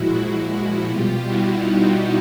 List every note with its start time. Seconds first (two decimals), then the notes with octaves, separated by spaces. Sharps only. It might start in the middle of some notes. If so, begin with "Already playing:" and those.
Already playing: A#2 F3 G#3 E4 F#4
0.17 E4 F#4
0.87 B2 G3 F4 G4
1.23 E4 F#4
1.59 D#4 F4